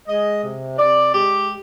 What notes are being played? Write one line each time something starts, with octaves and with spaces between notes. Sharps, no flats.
G#3 D#5
C3
C3 D5
G#3 G4